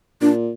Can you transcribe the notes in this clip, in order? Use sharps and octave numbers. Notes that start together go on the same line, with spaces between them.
A#2 D4